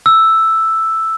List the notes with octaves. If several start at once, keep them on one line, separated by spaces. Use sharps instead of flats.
E6